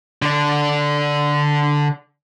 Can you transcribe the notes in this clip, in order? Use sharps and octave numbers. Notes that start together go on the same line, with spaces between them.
D3 D4